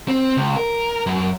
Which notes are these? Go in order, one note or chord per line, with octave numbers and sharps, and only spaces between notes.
C4
C#2
A#4
F#2